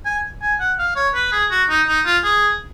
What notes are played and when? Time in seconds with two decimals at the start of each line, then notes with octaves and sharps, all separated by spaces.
0.05 G#5
0.42 G#5
0.60 F#5
0.79 F5
0.96 C#5
1.14 B4
1.32 G#4
1.51 F#4
1.69 D#4
1.87 D#4
2.05 F4
2.24 G#4